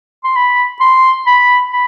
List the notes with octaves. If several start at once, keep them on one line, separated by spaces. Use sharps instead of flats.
C6
B5
C6
B5
B5